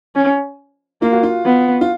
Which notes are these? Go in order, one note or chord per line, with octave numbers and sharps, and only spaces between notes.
C#4
A#3 F4
F#4
F4
B3
F4